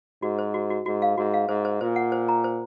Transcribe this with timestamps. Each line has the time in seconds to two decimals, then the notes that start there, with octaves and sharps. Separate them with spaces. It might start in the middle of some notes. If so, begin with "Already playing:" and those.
0.23 G#2 F#4
0.39 C5
0.54 F#4
0.70 F#4
0.86 G#2 F#4
1.02 F5
1.17 G#2 F#4
1.34 F5
1.49 G#2 C5
1.65 C5
1.81 A#2 C5
1.96 F#5
2.12 C5
2.29 A#5
2.44 C5